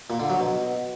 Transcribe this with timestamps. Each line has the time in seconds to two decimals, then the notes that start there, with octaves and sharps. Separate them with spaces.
0.10 A#2
0.20 D3
0.30 F#3
0.40 B2